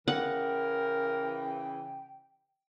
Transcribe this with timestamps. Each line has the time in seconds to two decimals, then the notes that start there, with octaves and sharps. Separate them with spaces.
0.08 C#3 E3 A#4 F#5 G5